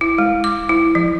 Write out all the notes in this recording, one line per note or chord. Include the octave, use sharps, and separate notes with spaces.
E4
G#3
D6
E4
F3